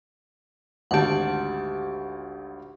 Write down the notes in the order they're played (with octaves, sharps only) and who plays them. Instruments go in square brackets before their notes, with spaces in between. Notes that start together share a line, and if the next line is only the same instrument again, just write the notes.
[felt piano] G#1 D2 A5 [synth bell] G4 F#5